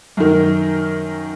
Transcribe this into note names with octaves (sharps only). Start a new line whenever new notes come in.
F#2 D#3